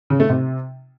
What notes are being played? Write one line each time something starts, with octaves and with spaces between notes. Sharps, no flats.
C#3
A3
C3